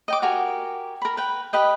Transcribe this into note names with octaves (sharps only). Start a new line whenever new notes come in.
D#5 G5 D6
F#4 G4 A#4 G#5
A#4 B5
B4 G5
G4 B4 D#5 G5